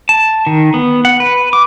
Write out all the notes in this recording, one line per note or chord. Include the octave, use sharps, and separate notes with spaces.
A5
D#3
B3
F#5
B4
D6